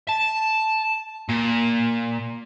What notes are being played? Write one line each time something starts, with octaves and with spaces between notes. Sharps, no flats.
A5
A#2